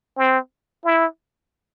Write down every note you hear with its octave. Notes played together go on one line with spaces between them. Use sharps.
C4
E4